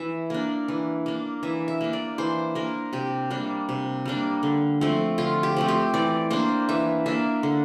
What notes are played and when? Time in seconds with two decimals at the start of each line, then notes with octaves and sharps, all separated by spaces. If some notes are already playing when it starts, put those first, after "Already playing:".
Already playing: E3 E5
0.30 A#3 D4
0.68 E3
1.06 A#3 D4
1.43 E3 E5
1.68 E5
1.81 A#3 D4
1.93 D5
2.18 E3 C5
2.55 A#3 D4 A#4
2.93 C3 G4
3.30 G3 A#3 D4
3.69 C3
4.06 G3 A#3 D4
4.43 D3
4.81 F3 A3 C4
5.18 D3 F4
5.43 G4
5.56 F3 A3 C4
5.68 G4
5.94 E3 D5
6.30 A#3 D4 C5
6.69 E3 E5
7.06 A#3 D4 E5
7.43 D3